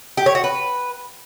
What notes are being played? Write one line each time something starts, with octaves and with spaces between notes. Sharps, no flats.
G4
C#5
F#4
B4